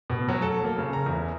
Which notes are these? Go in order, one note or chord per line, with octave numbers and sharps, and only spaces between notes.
B2
F#3
A4
A#3
C#3
A#5
E2